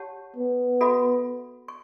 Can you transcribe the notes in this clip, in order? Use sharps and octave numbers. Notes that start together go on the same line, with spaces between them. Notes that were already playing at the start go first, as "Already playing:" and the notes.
Already playing: G4 C#5 F#5 A5 C#6
B3
F#4 A4 E5 B5
C#6